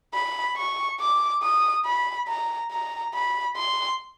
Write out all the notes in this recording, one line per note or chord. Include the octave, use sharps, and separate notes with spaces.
B5
C#6
D6
D#6
B5
A#5
A#5
B5
C6